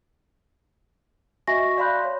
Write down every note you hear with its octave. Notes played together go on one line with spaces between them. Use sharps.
F#4 D#5 E5 G#5 C#6 A#6
D5 F5 B5 C6 F#6 G6
C#5